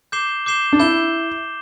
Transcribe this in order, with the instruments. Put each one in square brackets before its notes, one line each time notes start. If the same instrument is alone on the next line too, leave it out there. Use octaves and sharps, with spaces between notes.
[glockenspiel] D6 G6 C7 E7 G7
D6 G6 C7 E7 G7
[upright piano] D4
[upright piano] E4 [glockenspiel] G6 E7 G7